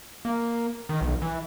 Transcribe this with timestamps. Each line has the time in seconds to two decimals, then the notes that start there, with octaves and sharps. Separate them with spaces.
0.25 A#3
0.89 D#3
1.01 B1
1.22 E3